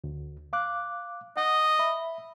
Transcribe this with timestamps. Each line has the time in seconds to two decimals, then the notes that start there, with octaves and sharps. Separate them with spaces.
0.04 D2
0.53 F5 D6 F#6
1.37 D#5 F#5
1.79 E5 B5